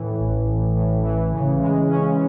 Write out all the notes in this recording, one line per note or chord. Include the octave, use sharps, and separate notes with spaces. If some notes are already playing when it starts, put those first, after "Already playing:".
Already playing: A2 E3
A1
A1
A2
E3
C#3
G#3
C#4